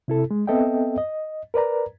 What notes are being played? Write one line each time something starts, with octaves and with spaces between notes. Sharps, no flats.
C3 E4 A4
G#3
B3 C4 A4 D#5 E5 G5
D#5
A#4 B4 D5 A#5